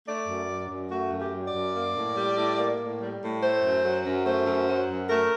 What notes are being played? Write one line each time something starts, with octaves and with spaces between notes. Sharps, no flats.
A3 D5
F#2
F#3
F#2
A3 F#4
F#2
G4
F#3
D5
F#2
A#3
A2
G3
A2
A#3
A2
G3
A2
A3 C5
F#2
F#3
F#2
A3 C5
F#2
F#3
F#2
A3 A#4